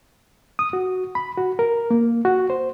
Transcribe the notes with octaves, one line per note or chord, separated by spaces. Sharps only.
D#6
F#4
B5
F#4
A#4
A#3
F#4
C5